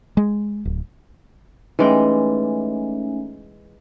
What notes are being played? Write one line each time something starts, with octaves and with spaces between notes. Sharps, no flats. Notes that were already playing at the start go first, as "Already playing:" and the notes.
G#3
D1
E3 G#3 A3 C#4 D#4 G5